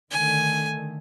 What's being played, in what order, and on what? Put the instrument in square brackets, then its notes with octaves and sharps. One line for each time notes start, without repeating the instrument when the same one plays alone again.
[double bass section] D3 D#3 A3 [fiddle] G#5